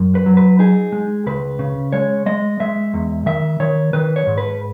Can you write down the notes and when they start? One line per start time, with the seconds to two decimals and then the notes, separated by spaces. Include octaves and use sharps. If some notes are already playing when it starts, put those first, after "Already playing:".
Already playing: F#2
0.15 B4
0.26 F#3
0.37 B4
0.59 D#4 G#4
0.92 G#3
1.26 C#2 B4
1.59 C#3
1.92 G#3 C#5
2.26 G#3 D#5
2.60 G#3 E5
2.94 E2
3.26 D#3 E5
3.60 D#3 C#5
3.93 D#3 B4
4.16 C#5
4.27 G#2
4.38 B4